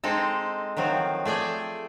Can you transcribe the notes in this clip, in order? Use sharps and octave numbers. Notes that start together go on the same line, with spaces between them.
G#3 C4 D#4 A4
D#3 F3 F#3 C4
A3 G#4 D5 G5